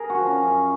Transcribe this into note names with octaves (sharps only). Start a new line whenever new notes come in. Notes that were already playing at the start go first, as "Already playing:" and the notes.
Already playing: G#4 A#4
F#4
F3
C#4
F#2